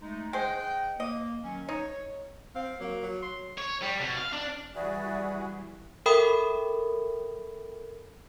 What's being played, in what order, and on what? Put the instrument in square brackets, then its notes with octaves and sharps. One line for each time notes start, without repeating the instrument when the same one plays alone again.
[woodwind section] G#3 A3 D#4
[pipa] G#3 C5 [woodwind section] D#5 F#5 G5
[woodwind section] A#3 [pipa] D#5
[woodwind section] D#3 F#3 C#4
[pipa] D#4 [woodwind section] C#5
[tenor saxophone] C4 [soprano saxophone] F5
[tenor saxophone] F#3 [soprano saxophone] A#3
[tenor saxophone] F#3
[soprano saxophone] C6
[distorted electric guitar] C#5
G3
B2
F5
D4
[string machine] E3 G3 [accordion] F#4 G#4 B4 [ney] D5 [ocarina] E5
[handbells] A4 A#4 E5 G5 B5 D#6